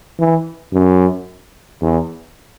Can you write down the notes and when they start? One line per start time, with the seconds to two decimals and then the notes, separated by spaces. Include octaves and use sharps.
0.19 E3
0.73 F#2
1.82 E2